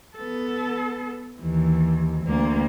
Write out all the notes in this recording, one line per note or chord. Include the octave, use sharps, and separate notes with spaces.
B3 A4
D#2 E3
D2 A#3